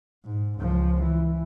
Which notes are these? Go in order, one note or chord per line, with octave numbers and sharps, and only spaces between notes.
G#2
C#2 F3
E3